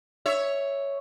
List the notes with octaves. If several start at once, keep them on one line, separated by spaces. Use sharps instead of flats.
C#5 E5